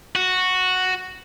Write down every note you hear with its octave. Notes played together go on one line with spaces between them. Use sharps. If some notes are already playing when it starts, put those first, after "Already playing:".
F#4